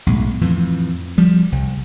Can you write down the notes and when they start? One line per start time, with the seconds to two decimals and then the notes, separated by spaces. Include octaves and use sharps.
0.07 B1 A2 G#3
0.41 F2 A2 E3
1.18 F3 G3
1.52 C2